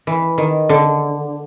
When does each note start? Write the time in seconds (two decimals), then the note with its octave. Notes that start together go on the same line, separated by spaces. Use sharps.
0.07 E3
0.38 D#3
0.69 D3